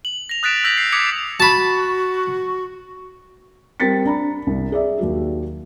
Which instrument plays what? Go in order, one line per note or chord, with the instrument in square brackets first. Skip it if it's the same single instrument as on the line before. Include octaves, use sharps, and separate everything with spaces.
[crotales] F#7
A#6 F7
D#6 F#6 A6 B6 D7 E7
E6 G6 A#6 B6 F#7
C7
D6 D#6 G#6 B6 C#7 F7
[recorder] F#4 [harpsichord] A5 B5
[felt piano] G3 C4 A#4 A6 B6 C#7
D4 A#5 B5
C2
G#4 D5 E5
D#2 F#3 F#4